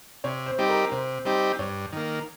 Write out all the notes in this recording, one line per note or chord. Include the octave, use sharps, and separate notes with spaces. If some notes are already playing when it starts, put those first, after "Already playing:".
C3 C#5
C5
G3 C4 D#4 G4
A#4
C3 C5
G3 C4 D#4 G4
G2 C#5
D#3 A#3